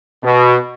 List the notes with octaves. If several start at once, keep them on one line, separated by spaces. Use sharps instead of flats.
B2